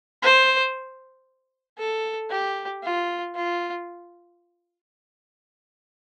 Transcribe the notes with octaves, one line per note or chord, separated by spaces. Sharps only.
C5
A4
G4
F4
F4